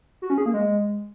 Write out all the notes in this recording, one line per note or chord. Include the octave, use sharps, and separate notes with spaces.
F#4
C#4
G#4
A#3
G#3